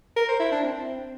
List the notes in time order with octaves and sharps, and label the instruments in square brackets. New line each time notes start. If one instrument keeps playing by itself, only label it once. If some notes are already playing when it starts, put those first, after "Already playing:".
[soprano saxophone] A#4
C5
E4
D4
C4